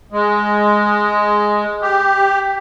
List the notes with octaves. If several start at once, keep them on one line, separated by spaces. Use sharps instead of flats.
G#3
G4